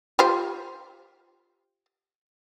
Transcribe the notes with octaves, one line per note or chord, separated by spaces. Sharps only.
F4 G4 C5